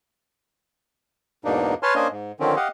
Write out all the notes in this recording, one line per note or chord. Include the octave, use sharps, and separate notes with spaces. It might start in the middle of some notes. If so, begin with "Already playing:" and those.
E2 G#2 B2 A#3 D4 D#4
B4 C#5 G#5 A5 C6 F6
A#3 C#4 D4 C5 D#5 G#5
G#2
D3 D#3 F3 C4 C#4
G4 D#5 F5 F#5